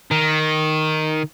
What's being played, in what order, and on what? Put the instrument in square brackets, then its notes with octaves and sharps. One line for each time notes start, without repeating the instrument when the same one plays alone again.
[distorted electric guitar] D#3